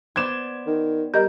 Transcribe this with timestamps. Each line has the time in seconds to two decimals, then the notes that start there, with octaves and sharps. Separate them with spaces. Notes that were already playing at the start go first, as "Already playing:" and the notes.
0.16 B3 C5 D5 G#6 E7
0.66 D#3
1.14 G3 A#4 D#5 G6